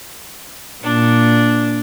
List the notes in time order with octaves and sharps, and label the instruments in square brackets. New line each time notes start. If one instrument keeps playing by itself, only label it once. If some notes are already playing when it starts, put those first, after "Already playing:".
[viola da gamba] A#2 [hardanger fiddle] D4